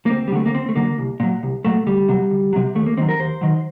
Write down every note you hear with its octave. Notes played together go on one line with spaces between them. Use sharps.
A#3
D2 C4
G3
D3 F#3 A3
A#3
D2 C4
A3
D3 F#3 A#3
C2
A#2 F#3
C2
A#2 F#3 A3
D2 G3
C3 F#3
D2
C3 F#3
D#2 A3
A#3
D#3 F#3 C4
A#4
D#2 C5
D#3 F#3